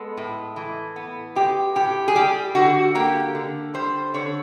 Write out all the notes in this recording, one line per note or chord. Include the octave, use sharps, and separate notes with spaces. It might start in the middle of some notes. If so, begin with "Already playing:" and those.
Already playing: G#3 B3 A4
A2
E3
B3
G#3 G4
A2 G4
G#4
G3 G4
D3 F#4
A#3 G4
D3
G3 C5
D3 C#5